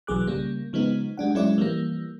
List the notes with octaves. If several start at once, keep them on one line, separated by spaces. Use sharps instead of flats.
B1 E3 F#3 G#4 D6 F#6
C#3 G3 A#3
C#3 F3 G#3 B3 D#4
G3 G#3 D4 F#5
F#3 G#3 C#4 E4 C#5 D5
E3 F3 G3 A#3